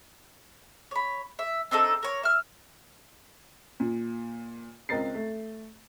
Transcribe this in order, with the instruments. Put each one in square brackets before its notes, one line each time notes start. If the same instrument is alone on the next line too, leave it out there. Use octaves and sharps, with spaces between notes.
[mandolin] C#5 B5
E5
C4 D4 D#4 A4
A#4 C#5
E5 F6
[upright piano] A#2
C#2 C4 A#4 D#5 A6 C7
A3